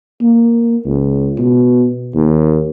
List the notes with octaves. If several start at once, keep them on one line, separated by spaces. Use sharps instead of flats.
A#3
C#2
B2
D#2